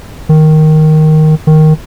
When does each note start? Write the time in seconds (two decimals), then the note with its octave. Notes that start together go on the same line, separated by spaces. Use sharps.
0.29 D#3
1.47 D#3